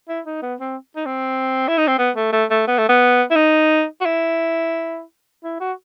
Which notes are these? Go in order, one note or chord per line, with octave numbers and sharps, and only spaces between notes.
E4
D#4
B3
C4
D#4
C4
E4
D#4
C4
B3
A3
A3
A3
B3
A3
B3
E4
D#4
F#4
E4
E4
F#4